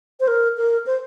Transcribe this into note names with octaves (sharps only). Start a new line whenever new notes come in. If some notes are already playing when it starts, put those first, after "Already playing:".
C5
A#4
A#4
C5